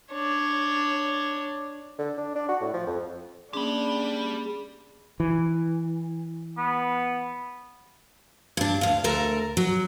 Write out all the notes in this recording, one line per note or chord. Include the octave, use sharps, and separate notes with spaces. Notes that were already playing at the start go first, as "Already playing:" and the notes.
D4 C#5
D3
D4
D4
F#4
A2
F3
F2
A#3 C#4 D4 G4 G#4 B5 C6
E3
B3
G2 D4
D2 F5
D2 A4 A#4
F#3